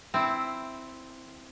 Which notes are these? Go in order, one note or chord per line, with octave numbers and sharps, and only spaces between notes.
C4 E4